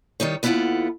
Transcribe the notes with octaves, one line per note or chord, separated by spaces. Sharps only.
D#3 G3 D#4 C#5
D#2 B3 E4 F4 A4 F#5